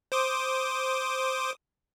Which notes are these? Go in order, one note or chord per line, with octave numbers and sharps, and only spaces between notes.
C5 D6 D#6